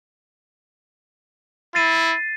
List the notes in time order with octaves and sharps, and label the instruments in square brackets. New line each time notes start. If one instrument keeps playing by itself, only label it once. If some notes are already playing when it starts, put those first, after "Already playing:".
[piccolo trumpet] E4 [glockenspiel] A6 C7 D#7